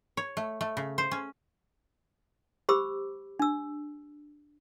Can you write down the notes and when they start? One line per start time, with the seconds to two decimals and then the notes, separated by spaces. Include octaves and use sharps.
0.17 C#5
0.37 A3
0.61 A3
0.77 C#3
0.98 C5
1.12 C#4
2.69 G4 C5 B5 D6 E6
3.40 D4 E6